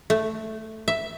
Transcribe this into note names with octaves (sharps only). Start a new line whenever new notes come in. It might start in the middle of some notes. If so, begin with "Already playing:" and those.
A3
E5